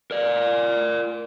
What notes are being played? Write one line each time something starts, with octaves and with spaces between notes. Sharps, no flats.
A#4 D5